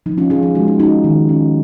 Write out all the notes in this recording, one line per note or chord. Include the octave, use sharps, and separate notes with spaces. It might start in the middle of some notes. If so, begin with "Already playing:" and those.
F3 D#4
C#4 F4
F3 F4 G#4
F4 G#4
G#3 D#4 F#4
D#4
C#4 D#4 F#4
D#3
C#4